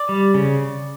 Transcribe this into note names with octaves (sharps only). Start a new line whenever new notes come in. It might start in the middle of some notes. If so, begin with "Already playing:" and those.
Already playing: D5
G3
C#3